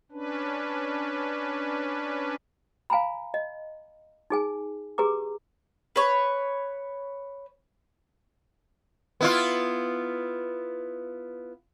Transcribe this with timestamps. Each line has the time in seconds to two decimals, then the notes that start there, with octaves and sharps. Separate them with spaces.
0.12 C#4 D4 B4
2.90 F5 G#5 A#5 B5
3.34 D#5
4.30 D#4 G#4 G#5
4.98 G4 G#4 B4 A#5 D6
5.96 B4 C#5
9.21 B3 E4 F4